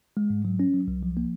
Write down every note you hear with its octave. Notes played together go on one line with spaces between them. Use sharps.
G#3
G#2
F#3
C#4
F#3
C2
F3
A#3